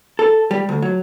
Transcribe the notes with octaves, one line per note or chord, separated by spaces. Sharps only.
A4
G3
D2
F#3